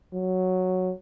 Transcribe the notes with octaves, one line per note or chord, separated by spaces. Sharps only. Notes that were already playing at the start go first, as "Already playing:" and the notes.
F#3